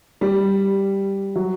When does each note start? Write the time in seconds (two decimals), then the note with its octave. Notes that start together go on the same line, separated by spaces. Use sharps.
0.21 G3
1.36 F#3